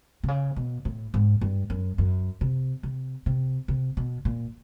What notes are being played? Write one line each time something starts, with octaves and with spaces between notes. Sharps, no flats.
C3
C#3
B2
A2
G#2
G2
F#2
F#2
C3
C3
C3
C3
B2
A#2